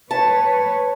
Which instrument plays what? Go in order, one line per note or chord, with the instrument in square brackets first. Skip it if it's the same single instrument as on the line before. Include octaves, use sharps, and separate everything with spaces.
[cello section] B4 C#5 [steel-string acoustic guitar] A5